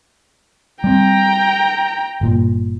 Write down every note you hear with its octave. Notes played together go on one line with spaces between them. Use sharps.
G3 C4 G5 A#5
G1 A#2